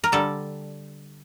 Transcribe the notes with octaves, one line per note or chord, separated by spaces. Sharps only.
A#4
D3 G3 A4